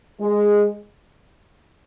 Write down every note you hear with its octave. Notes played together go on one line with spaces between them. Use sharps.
G#3